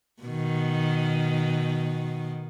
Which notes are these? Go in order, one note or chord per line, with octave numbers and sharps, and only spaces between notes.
B2 D#3